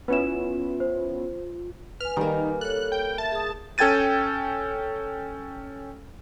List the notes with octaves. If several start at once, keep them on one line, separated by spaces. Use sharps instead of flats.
B3 C#4 E4 F4 B4 E7
C5
B4 G#5 F6
D#3 G3 A#3
A4 C#5 F#6
G5
E5 A5
G#4 D#6
C#4 A4 G5 G#6 A6 D#7